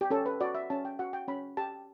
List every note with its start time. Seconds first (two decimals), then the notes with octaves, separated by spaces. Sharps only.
0.01 G4
0.10 C#4 A4
0.26 B4
0.41 F#4 D5
0.55 E5
0.70 C#4 A5
0.85 G5
0.99 F#4 F#5
1.13 G5
1.28 C#4 B5
1.57 G4 A5